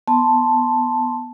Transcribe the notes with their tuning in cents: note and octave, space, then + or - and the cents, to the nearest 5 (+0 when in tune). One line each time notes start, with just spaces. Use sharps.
B3 +0 A5 +0 C6 +0